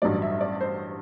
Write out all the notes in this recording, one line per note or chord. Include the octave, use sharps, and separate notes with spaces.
A1 G2 F#3 D5
E5
D5
C5